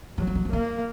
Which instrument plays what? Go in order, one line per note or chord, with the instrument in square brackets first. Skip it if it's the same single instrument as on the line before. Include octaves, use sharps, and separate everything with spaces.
[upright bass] D#3 [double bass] F#3
[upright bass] F3
D#3
F3
[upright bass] D#3 [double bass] A#3